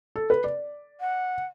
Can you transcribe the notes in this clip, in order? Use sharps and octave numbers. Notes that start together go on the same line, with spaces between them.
A4
B4
D5
F#5